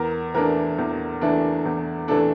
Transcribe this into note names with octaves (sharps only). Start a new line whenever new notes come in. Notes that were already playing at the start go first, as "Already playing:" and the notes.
Already playing: E2 A#4
E3 A3 D4 A#4
E2
E3 A3 D4
E2
E3 A3 D4 A4